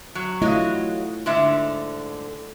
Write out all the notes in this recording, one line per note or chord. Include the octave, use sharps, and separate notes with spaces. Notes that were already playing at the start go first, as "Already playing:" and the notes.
F#3
F#3 A3 E4 F4 D#5
G#2 D3 E5